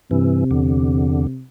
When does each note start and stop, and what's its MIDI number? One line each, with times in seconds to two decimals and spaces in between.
0.11 0.44 43
0.11 1.45 48
0.11 0.44 52
0.51 1.27 40
0.51 1.27 50